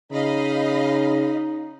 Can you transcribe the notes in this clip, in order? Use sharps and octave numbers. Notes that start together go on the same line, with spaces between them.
C#3 D#4 D#5 F5 B5